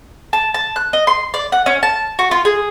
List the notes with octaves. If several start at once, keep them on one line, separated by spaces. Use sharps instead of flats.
A5
A5
F#6
D#5
C6
D5
F#5
C#4
A5
F#4
F4
G#4